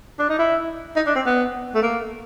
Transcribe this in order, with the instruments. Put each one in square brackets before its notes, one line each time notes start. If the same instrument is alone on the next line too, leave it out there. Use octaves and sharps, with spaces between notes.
[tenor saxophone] D4
D#4
E4
D#4
D4
C4
B3
A3
A#3